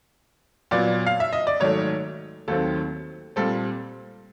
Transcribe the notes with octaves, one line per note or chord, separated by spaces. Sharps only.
A#2 F#3 B3 D5
F5
E5
D#5
D5
G#2 D#3 F#3 A3 C#5
D#2 D#3 F#3 A3 C4 A4
A#2 G3 C4 A4